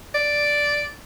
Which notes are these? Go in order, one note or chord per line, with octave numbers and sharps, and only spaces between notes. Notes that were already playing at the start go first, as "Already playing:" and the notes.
D5